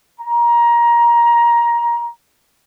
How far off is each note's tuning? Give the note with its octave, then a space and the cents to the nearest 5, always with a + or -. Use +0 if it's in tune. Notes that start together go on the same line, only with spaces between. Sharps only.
A#5 +20